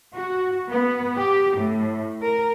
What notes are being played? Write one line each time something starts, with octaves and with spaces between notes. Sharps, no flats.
F#4
B3
G4
A2
A#4